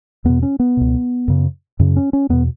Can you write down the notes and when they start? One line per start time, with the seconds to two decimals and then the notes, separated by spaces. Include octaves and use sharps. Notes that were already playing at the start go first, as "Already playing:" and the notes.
0.25 E2 B2 B3
0.43 C#4
0.60 B3
0.77 C#2 B2
1.28 F#2 C#3
1.79 F#2 C#3
1.96 C#4
2.13 C#4
2.29 E2 B2 B3